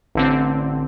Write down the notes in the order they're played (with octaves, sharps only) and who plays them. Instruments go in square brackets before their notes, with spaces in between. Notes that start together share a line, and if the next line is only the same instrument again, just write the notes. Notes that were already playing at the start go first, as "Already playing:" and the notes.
[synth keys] A1 D3 C4